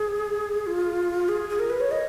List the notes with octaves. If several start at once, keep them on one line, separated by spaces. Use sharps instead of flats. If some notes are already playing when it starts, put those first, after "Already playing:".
Already playing: G#4
F4
G#4
G#4
A#4
B4
C#5
D#5